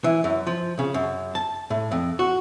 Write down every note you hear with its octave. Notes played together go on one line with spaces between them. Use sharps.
E3
F#2
F3
C#3
F#2
A5
A2
F2
F#4